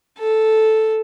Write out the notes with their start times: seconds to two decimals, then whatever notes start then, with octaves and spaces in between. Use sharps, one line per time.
0.18 A4